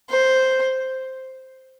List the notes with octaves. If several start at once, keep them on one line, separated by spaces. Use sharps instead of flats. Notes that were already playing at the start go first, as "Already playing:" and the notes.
C5